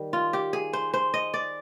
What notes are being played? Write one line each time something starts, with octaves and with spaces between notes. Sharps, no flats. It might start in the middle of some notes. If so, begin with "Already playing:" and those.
Already playing: D#3 G3
F4
G4
G#4
C5
C5
D#5
D5